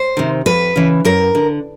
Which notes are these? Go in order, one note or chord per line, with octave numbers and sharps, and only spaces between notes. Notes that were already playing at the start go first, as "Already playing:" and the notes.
Already playing: C5
C3 D#3
F2 B4
C#3 E3
F#2 A#4
D3